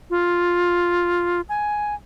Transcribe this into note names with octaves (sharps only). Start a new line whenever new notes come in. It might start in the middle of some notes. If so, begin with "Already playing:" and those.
F4
G#5